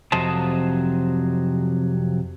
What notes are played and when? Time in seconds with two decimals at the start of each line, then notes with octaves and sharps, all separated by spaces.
0.12 F2 C3 F#3 C5 D#5 A5